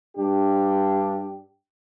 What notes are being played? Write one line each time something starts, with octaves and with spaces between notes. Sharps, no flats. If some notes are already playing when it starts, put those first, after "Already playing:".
G2 D4 G4